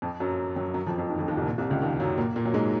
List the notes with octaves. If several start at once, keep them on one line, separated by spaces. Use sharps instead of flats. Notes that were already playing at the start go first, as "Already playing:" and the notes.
F2 F3
F#2 F#3
F#2 F#3
F#2 F#3
F2 F3
F2 F3
D#2 D#3
F2 F3
D#2 D#3
C2 C3
A#2
C2 C3
C#2 C#3
D#2 D#3
F#2 F#3
A#2 A#3
A#2 A#3
F#3
G#2 G#3